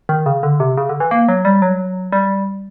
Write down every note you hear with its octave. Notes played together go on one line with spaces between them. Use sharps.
D#3
C#3
D3
C3
C#3
D3
E3
A#3
F#3
G3
F#3
G3